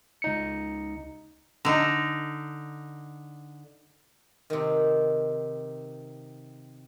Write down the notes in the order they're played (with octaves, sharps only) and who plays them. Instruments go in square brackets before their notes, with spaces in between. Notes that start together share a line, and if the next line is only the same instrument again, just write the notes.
[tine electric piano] C#2 D#4 C#7
[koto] D3 D#4
[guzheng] C3 D#3